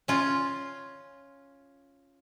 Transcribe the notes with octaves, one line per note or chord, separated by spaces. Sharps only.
C#4 F4